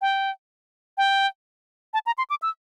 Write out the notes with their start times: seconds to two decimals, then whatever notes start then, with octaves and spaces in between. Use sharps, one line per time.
0.02 G5
0.98 G5
1.94 A5
2.06 A#5
2.18 C6
2.30 D6
2.42 E6